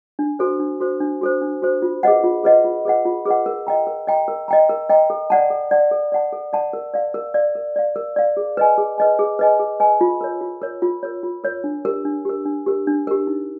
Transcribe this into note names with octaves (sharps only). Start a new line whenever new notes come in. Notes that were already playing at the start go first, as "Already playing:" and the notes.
D4
F#4 A4 C5
D4
F#4 A4 C5
D4
F#4 A4 C5
D4
F#4 A4 C5
F4
G#4 B4 D#5 F#5
F4
G#4 B4 D#5 F#5
F4
G#4 B4 D#5 F#5
F4
G#4 B4 D#5 F#5
A#4
D#5 G5 A#5
A#4
D#5 G5 A#5
A#4
D#5 G5 A#5
A#4
D#5 G5 A#5
A4
D5 F#5 A5
A4
D5 F#5 A5
A4
D5 F#5 A5
A4
D5 F#5 A5
A#4
D5 F5
A#4
D5 F5
A#4
D5 F5
A#4
D5 F5
G#4
B4 D#5 G#5
G#4
B4 D#5 G#5
G#4
B4 D#5 G#5
G#4
B4 D#5 G#5
F4
A#4 C#5
F4
A#4 C#5
F4
A#4 C#5
F4
A#4 C#5
D4
G4 A#4
D4
G4 A#4
D4
G4 A#4
D4
G4 A#4
D#4